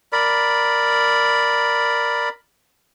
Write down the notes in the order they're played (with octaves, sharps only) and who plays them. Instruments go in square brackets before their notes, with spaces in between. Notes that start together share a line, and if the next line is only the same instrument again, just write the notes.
[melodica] A#4 D5 B5